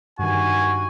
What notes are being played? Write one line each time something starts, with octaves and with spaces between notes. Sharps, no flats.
G2 D#3 F#4 G#5